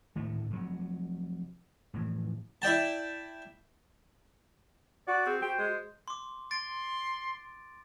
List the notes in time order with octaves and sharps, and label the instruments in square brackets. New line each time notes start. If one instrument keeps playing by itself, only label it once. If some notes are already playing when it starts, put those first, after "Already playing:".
[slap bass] G#1 D2 A2 A3
F1 F#3
F1 A2 E3
[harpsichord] E4 D5 G5 A5
[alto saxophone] F#4 [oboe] D5
[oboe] C4 [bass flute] G#4
[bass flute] F#4 [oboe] C5 [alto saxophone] G5
[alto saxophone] G#3
[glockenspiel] C6 D6
[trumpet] C6 [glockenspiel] A6 D7